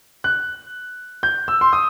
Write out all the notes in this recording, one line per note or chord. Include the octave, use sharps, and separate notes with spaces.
F#6
G6
E6
C6
D#6